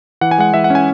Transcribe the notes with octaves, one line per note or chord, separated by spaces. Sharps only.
E3 F#5
G#5
G#3 F#5
E3 E5
F#5
C#4 G#5